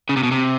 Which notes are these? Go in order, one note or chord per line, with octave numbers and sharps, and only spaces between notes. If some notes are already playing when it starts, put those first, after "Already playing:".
C#3
C3
B2
C3